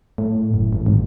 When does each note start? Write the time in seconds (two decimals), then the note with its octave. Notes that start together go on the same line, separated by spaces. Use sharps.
0.18 A2
0.54 F#1
0.73 A1
0.86 G#1